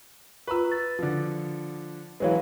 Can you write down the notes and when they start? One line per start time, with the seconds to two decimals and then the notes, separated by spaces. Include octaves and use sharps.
0.47 F4 B4 A#5 C#6 E6
0.72 A6
0.99 D3 F3
2.20 E3 F#3 G#3 B4 C#5 F5